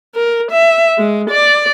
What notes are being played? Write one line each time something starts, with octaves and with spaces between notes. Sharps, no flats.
A#4
E5
G#3
D5